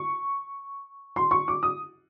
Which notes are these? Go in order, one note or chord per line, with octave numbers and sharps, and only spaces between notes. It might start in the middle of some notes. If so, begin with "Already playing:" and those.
Already playing: C#6
C6
C#6
D6
D#6